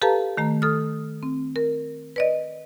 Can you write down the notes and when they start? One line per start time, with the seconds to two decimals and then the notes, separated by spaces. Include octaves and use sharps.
0.02 G4 A4 B4 F5 A5 A#5
0.37 D#3 A3 A#5
0.62 A4 D#6 F6
1.23 C4
1.56 A#4
2.16 B4 D5 D#5